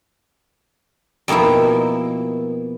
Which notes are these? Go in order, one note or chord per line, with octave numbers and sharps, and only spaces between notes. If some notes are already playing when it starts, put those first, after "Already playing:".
F2 B2 A#3 D#4 E4